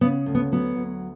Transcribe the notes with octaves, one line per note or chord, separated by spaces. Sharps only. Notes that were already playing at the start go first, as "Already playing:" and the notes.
C#3 B3
D2
B3
F#3 B3
D2